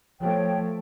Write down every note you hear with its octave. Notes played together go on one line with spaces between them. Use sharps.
F3 A3 C#5 G5